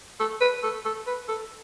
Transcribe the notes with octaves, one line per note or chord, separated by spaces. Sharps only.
A4
B4
A4
A4
B4
A4